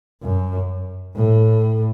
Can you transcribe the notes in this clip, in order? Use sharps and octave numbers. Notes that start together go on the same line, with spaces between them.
F#2
A2